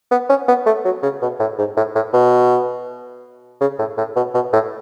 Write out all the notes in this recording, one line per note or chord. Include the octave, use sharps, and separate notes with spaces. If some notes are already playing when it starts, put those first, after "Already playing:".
B3
C#4
B3
A3
F#3
C#3
B2
A2
G#2
A2
A2
B2
C#3
A2
A2
B2
B2
A2